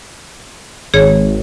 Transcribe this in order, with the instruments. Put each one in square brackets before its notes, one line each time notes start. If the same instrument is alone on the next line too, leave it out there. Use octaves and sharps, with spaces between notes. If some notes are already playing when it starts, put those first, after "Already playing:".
[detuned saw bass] G#1 [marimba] G#4 C#5